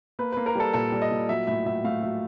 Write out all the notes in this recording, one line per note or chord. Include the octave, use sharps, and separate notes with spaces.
A#3 B4
A#3 B4
A#4
G3 A4
A#2 A4
G3
D#5
A#2
F#3 E5
A2 E5
F#3 E5
A3 F5
F#3 E5